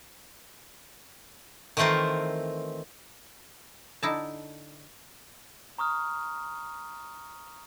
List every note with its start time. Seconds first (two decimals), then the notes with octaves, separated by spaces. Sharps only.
1.77 D#3 E3 A3 C4 F4 A#4
4.03 D3 D#4 E4 A5
5.78 A#5 C#6 D#6 F6